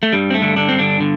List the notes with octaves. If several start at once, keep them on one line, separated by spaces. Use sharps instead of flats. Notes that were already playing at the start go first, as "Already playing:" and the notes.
A3
G2 G3
C4
A3
D3
D3 D4
G2 C4
D3 D4
D3